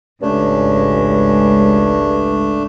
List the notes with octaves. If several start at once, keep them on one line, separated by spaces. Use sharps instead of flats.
G#1 C#2 G2 A3 C#4 D4